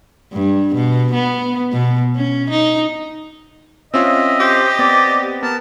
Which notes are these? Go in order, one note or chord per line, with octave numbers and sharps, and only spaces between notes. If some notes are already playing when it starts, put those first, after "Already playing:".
G2
B2
B3
B2
C#4
D#4
C4 C#4 F4 D#5 E5
G4 C5
B3 C4 D5
B3 A#4 A5